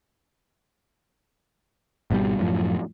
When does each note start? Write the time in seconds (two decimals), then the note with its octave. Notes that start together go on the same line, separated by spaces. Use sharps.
2.10 G#1 B2 D3 G3
2.40 F#2 A2 F3